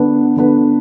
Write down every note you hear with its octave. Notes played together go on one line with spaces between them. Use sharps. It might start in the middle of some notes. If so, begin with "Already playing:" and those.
Already playing: D3 B3 D4 B4
D3 B3 D4 B4